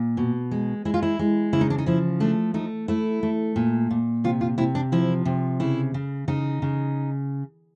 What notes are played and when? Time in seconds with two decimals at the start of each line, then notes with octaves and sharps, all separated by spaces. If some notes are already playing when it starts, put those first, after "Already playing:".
Already playing: A#2
0.17 B2
0.51 G#3
0.85 G#3 E4
0.94 F4
1.02 E4
1.19 G#3
1.53 C#3 E4
1.61 D#4
1.70 D4
1.78 D#4
1.86 F3 E4
2.20 A3 D4
2.54 A3 D#4
2.88 A3 E4
3.23 A3
3.56 A#2
3.91 A#2
4.24 C3 F4
4.41 F4
4.58 C3 E4
4.75 D4
4.92 F3 E4
5.25 C3
5.60 C#3 E4
5.94 C#3
6.28 C#3 D#4
6.62 C#3